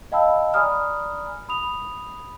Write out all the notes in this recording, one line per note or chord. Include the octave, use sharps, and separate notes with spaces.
D#5 F5 G5 A5 B5 E6
D5 G#5 A#5 B5 D#6 F6
B5 D#6 F7